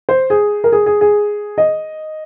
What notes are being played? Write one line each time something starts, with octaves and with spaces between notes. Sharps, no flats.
C5
G#4
A#4
G#4
G#4
G#4
D#5